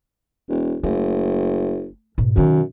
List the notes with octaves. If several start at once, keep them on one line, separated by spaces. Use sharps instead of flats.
E1
F#1 A3
G#2 B2
F#2 C3 D#3